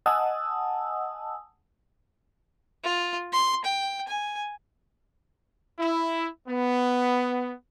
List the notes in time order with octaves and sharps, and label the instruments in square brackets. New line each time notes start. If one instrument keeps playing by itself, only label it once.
[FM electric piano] D#5 F#5 G#5 A5 D#6 E6
[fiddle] F4
C6
G5
G#5
[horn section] E4
B3